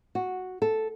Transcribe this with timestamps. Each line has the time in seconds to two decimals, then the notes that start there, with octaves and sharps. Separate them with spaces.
0.15 F#4
0.62 A4